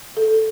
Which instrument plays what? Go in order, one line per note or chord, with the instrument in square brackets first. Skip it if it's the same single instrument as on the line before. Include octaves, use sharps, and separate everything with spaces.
[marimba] A4